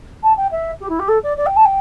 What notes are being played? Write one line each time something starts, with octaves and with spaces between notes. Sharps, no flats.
A5
G5
E5
G4
E4
G4
A4
D5
D5
G5
A5
G5